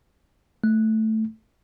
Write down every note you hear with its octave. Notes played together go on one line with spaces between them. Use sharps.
A3